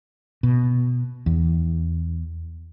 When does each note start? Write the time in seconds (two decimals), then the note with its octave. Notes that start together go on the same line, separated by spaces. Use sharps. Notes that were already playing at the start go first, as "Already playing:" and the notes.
0.43 B2
1.26 E2